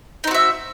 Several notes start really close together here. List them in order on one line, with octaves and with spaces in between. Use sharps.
D#4 C4 F#4 E5